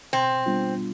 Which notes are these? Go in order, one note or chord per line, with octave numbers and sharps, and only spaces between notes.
B2 C4
G3 B3 D4 F4